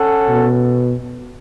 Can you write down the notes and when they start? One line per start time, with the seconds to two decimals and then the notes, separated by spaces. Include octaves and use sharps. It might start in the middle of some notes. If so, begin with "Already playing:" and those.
Already playing: C#4 A4 F#5
0.28 B2